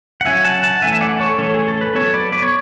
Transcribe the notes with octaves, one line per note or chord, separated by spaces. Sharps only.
F#5
F#3 C#4 E5 G#5
F#5 A5
F#5 A5
E3 A3 C#4 E5 G#5
D5 F#5
A4 C#5
E3 A3 C#4 A4 C#5
G#4
A4
B4
F#3 B3 A4 C#5
B4 D5
B4 D5
C#5